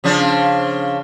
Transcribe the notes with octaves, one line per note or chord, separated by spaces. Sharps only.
C#3 F3 D4